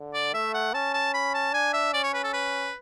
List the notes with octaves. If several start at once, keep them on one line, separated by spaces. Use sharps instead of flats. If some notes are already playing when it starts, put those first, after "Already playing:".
Already playing: D3
D5
A3 E5
F#5
C#4 A5
A5
B5
A5
D4 G#5
E5
C#4 D5
C#5
B4
A4
B4